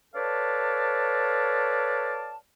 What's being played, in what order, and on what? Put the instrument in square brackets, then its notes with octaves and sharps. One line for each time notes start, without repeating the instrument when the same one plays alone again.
[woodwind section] A4 B4 C#5 D5 F5 A5